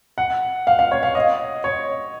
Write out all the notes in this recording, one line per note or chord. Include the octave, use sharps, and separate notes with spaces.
F#5
F5
F5
C#5
F5
D#5
C#5